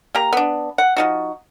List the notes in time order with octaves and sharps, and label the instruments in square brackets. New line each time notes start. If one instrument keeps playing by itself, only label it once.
[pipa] A#3 G4 A#5
B3 D4
F#5
F3 D#4 F#4